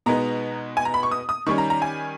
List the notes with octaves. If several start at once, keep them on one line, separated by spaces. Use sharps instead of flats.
B2 G#3 B3 D#4 A#5
G#5
A#5
B5
C#6
D#6
D#6
D#3 G3 C#4 C#6
A#5
A#5
G#5